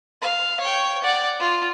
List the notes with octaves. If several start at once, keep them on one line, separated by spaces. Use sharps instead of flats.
F5
C#5 G5
D5 F#5
F4